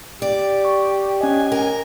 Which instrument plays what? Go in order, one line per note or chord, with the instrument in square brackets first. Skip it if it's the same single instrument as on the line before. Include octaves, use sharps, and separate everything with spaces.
[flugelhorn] G4 [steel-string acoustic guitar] D5
[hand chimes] C#6
[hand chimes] C#4 D#5 [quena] G#5
[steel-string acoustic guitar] A#4